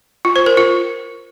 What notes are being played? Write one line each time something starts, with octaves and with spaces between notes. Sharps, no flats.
F4
C5
A#4
F4